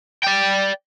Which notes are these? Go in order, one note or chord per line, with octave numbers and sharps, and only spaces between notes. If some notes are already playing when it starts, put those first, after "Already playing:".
D5 G5